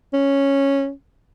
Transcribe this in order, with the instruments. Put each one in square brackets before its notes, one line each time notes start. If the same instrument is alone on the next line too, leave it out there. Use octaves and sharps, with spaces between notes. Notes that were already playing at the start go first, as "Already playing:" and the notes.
[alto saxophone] C#4